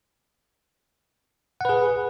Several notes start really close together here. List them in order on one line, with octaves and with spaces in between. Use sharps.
F#5 B4 G#4